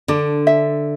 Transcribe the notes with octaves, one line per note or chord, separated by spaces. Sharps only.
D3 D4
E5